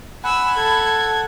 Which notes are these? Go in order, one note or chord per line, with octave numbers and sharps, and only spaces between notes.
F#5 G#5 B5 E6
A4 G#6